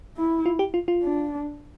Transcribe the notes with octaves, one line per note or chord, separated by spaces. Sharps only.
E4
F4
G4
F4
F4
D4